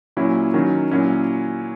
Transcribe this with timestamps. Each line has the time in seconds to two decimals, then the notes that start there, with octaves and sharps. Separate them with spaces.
0.17 A#2 F#3 C#4 E4
0.54 D#3 F#3 C#4
0.91 A#2 F#3 C#4 E4